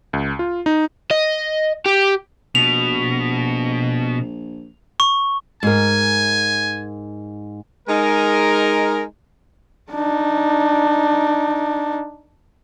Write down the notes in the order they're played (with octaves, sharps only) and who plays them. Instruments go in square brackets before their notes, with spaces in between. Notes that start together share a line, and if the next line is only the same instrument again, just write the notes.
[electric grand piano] C#2
F4
D#4
[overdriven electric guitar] D#5
G4
[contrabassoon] A#1 [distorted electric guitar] B2 [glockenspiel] F7
[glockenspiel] C#6
[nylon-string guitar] G#2 A#4 [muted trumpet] G#5
[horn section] G#3 D#4 A#4
[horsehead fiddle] D4 D#4